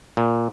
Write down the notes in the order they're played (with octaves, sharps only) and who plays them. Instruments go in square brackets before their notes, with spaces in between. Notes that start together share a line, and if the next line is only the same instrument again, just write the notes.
[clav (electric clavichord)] A#2